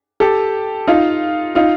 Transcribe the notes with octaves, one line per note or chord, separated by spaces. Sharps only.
G4 A4
D#4 F4
D#4 F4